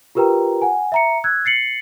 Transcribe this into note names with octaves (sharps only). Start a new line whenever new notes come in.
F4 G4 A#4 B4 G5 A#5
F#5 G#5
E5 A#5 C#7
E6 F#6 G#6
A6 C7 C#7 F#7